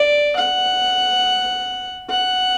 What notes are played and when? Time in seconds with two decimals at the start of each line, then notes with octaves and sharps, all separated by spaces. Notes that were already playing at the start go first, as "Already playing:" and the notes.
Already playing: D5
0.36 F#5
2.10 F#5